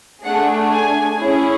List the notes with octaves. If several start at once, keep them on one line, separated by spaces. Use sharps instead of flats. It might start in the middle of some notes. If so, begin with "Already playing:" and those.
A3 D4 G#4 F#5
G#5
C#4 E4 G#4